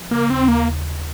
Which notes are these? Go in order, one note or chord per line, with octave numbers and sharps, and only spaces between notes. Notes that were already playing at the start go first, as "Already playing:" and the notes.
Already playing: F3
C#3 A#3
D#2 C4
D#2 A#3